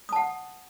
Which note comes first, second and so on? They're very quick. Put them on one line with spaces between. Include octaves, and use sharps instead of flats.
D#6 A5 F#5